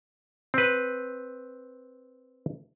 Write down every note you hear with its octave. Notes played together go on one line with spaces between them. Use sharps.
C4 B4